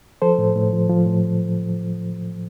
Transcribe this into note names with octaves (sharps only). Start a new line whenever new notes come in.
F3 A4 C5
A2
A2
F3
F3
A2